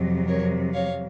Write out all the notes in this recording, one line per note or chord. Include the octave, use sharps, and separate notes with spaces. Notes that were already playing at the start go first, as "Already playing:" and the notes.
Already playing: F2 C3 F#3
A#4 C#5
C#5 F5